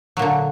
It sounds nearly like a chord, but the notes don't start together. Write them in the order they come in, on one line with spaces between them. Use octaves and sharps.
F#3 A#2 D3